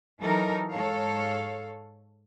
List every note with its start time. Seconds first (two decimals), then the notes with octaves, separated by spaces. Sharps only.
0.21 E3 F#3 D#4 A4 A#4
0.71 G#2 A4 C#5 F5